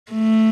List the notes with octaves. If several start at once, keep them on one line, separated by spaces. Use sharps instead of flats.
A3